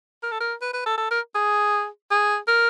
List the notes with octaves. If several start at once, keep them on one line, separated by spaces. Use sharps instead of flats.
A#4
A4
A#4
B4
B4
A4
A4
A#4
G#4
G#4
A#4